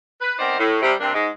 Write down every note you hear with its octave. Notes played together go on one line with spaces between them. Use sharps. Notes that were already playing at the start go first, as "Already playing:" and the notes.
B4
B3 C4 D#4 A#4 C5 D5
A2
C3 G3
G2 C3 A#3 C4 D4
G#2 G#3